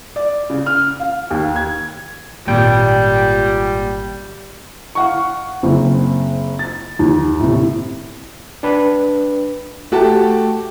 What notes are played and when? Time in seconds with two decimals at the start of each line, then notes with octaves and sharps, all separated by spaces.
0.16 D5
0.50 C#3
0.66 F6
1.00 F5
1.30 D#2
1.56 G#6
2.47 G#1 A#2 G3 G5
4.95 F5 F#5 C#6
5.63 F#1 C4
6.59 A6
6.99 D#2
7.40 A2 C3
8.63 D4 B4
9.92 A3 F#4 G4 A5